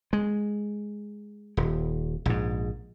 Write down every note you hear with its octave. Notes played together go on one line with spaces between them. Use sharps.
G#3
D#1
A#1 G#2